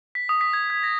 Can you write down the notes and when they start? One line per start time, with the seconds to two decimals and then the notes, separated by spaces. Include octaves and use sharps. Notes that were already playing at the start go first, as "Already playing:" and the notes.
0.15 B6
0.29 D#6
0.41 B6
0.53 G#6
0.70 G#6
0.83 A#6